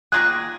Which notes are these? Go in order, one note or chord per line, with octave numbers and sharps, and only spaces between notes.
D#3 A#3 F4 G#4 F#6